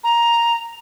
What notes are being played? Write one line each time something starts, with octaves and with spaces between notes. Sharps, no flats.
A#5